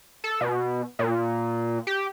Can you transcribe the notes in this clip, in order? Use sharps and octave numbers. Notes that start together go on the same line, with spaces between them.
A4
B2
A#2
G4